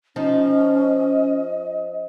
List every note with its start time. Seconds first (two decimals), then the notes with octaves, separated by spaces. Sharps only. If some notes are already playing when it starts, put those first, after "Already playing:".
0.16 F3 C#4 D#4 D#5